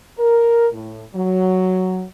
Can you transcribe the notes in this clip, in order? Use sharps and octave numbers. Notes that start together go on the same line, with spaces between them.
A#4
A2
F#3